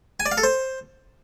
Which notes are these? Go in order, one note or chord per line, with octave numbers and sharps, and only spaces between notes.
G#5
D5
F5
A4
C5